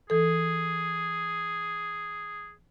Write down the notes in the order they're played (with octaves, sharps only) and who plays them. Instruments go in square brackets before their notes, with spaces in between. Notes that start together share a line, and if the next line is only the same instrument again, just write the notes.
[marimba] E3 A4 [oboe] G#4